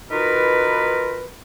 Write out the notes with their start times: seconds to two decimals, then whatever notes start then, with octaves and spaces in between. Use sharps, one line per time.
0.10 D#3 D#4 F4 F#4 A#4 B4